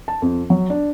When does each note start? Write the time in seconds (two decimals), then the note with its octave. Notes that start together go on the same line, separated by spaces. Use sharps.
0.08 A5
0.22 F2
0.50 F#3
0.70 D4